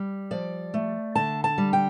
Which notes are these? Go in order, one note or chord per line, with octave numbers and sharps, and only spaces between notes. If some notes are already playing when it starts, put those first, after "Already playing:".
Already playing: G3
F3 D5
A3
D3 A5
A5
G3
G5